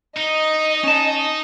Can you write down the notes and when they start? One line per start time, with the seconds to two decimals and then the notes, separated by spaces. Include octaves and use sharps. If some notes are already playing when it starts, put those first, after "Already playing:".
0.17 D#4 D#5
0.84 C#4 A5